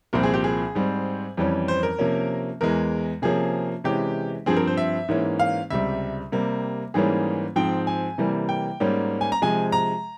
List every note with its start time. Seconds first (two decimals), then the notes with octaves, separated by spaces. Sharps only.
0.13 C2 A#2 F3 C4 A#4
0.23 G#4
0.34 G4
0.44 G#4
0.75 G#2 G3 C4
1.37 F2 E3 G3 C#4
1.68 C5
1.83 A#4
1.99 C3 F3 A#3 C#4
2.61 E2 E3 G#3 A#4
3.22 C3 F3 A#3 C#4 G#4
3.84 C3 E3 G#3 C#4 G4
4.46 G2 F3 C4 G#4
4.57 A#4
4.67 C5
4.77 E5
5.08 G#2 E3 A#3 C#4
5.39 F5
5.70 C#2 C3 G3 E5
6.32 C3 G3 A#3
6.94 G#2 E3 G3 A#3 C#4 G#4
7.56 G#2 F3 C4 G5
7.87 G#5
8.18 C3 E3 G3 A#3
8.49 G5
8.80 G#2 G3 A#3 C#4
9.21 G#5
9.32 A#5
9.42 C3 F3 G#3 G#5
9.72 A#5